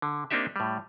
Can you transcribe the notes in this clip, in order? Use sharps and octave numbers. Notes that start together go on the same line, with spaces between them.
D3
A#3 C4 D4 D#4 G4 E5
A2 G3